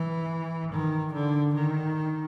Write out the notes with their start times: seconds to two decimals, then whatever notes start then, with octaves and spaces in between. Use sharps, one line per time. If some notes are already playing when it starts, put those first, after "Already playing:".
Already playing: E3
0.73 D#3
1.14 D3
1.55 D#3